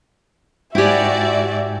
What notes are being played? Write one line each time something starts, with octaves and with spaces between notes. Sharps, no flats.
G#2 E4 F#4 G4 D5 E5 G5 G#5